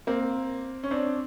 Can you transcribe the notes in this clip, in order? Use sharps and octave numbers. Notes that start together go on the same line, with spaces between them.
A#3 C4
C#4
C4 D4